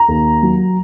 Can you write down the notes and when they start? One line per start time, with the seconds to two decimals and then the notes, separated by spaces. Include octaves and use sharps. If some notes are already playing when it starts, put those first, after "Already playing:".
Already playing: A#5
0.08 D#2
0.43 F#3